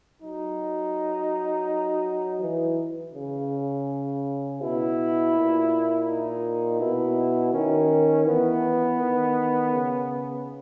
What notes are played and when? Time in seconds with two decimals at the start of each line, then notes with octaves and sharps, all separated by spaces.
0.22 F#3 D#4
2.42 E3
3.14 C#3
4.61 B2 E4
5.34 A#2
6.07 D#4
6.80 B2 E4
7.53 D#3 C#4
8.26 E3 B3
8.99 D#3
9.72 C#3